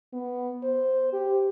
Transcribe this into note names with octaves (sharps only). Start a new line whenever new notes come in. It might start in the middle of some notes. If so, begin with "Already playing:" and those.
B3
C5
G4